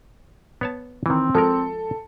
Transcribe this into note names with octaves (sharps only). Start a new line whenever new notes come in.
B3 C#5 A5
D#3 E3 C4
F3 G#3 A4 A#4